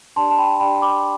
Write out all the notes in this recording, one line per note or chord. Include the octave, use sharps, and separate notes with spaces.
D4 G4 D5 A5 C6
A5
G5 B5
A5
D4 G4 D5 G5 B5
B5 D6